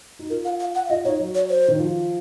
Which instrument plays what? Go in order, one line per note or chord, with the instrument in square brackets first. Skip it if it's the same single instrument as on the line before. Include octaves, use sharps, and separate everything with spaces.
[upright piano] D#4
[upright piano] F4 [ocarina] A#4
[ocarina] F5
F5
F#5
F5
[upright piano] F4 [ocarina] D#5
[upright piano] D#4 [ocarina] C#5
[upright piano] F#3
[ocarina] C#5
C5
[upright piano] D#3
F3